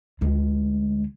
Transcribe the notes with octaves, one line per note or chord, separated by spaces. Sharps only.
D2 G#3